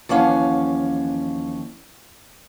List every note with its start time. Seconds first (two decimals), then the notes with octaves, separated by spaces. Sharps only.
0.09 D#2 E3 F3 C#4 F5 F#5